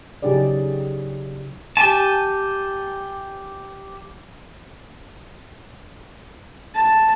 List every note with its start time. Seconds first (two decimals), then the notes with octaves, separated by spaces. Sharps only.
0.22 C#3 F#3 D#4 G4 G#4 D5
1.77 G4 G#5 A5
6.75 A5